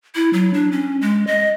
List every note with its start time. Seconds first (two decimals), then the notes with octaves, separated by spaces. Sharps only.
0.15 E4
0.33 F#3
0.54 D4
0.72 C#4
1.01 G#3
1.27 D#5